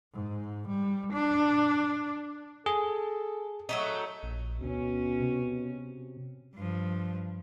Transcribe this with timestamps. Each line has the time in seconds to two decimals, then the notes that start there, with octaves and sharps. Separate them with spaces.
0.14 G#2
0.68 G3
1.13 D4
2.66 G#4 A4
3.69 F#3 A3 D#4
4.23 A#1
4.61 D2 B2 C#4
5.21 C3
6.55 G2 F3